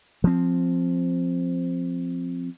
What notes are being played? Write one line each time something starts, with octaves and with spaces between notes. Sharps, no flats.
F3 C4